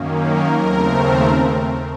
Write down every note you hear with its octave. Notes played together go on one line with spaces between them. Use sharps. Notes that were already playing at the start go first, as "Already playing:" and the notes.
Already playing: F#2 D#3 A#3 C#4
A#4
D#2 C#3 A3 C4